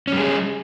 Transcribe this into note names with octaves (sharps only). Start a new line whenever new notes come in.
G3 C#4 G#4